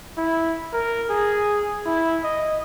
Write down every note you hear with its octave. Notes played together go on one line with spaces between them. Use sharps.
E4
A#4
G#4
E4
D#5